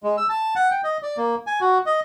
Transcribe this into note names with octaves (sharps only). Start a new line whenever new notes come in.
G#3
E6
A5
F#5
G5
D#5
D5
A#3
G#5
F#4
D#5